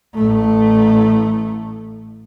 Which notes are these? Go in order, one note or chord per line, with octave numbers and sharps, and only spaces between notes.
A1 A3